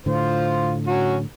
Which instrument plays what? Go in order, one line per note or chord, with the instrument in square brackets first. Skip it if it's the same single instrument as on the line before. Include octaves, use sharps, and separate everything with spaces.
[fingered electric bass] A2 D3 [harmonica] F4 C5
[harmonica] F#3 C#4 F#4